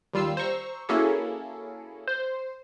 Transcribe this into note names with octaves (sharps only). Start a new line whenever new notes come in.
D#2 G3 F4 E6 C7
C5 A#5 C#6 E6
A#3 C#4 E4 F#4 G#4 A4
C5